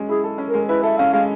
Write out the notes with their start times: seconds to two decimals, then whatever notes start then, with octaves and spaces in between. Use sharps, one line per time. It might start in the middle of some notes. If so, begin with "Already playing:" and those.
Already playing: G#3 C#4
0.09 E4 G#4
0.24 A4
0.38 C#4
0.48 A#4
0.54 G#3
0.69 E4 B4
0.83 A4 E5
0.98 C#4 F5
1.13 G#3 F5